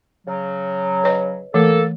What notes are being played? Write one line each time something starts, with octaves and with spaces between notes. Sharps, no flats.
C#3 F#3
B4 C#5 D#5
E3 A3 A#3 A4